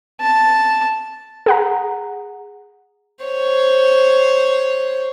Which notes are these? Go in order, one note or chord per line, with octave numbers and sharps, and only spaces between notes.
A5
G#4 F#5 A#5
C5 C#5